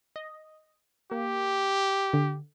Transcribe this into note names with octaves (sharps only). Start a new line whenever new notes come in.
D#5
A#3 G4
D3